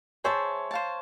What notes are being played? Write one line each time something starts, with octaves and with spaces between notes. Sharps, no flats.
G#4 C5 C#5 E5 A5
C5 F5 A5